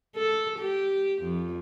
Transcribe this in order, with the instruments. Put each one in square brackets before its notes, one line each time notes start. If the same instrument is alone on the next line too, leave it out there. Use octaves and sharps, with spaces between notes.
[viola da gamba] A4
G4
F2